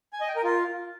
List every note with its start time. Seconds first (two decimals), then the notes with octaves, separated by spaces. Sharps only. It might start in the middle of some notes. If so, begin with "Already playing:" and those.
0.13 G#5
0.21 D#5
0.28 G5
0.36 A#4
0.44 F4